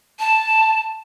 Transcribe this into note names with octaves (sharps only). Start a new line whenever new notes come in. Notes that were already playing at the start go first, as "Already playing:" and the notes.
A5